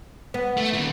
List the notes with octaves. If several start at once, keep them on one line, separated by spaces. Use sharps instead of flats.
B3
A3
A#2 D#3